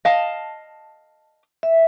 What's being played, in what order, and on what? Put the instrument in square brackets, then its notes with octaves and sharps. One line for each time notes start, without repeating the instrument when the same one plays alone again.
[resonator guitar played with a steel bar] D#5 F5 A5
[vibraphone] E5